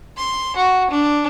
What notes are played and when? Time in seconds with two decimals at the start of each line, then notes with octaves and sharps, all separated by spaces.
0.17 C6
0.56 F#4
0.90 D4